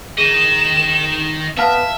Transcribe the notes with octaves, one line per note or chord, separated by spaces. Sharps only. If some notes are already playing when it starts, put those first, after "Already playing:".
D#3 G#4 D#5 D#7 E7
B3 E5 F5 A5 F6